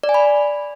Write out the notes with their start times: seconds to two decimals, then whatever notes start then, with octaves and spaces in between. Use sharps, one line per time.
0.03 D5
0.09 G#5
0.14 B5